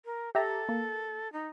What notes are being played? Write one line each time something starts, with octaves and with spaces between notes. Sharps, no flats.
A#4
G4 A4 E5 A#5
A#3
D#4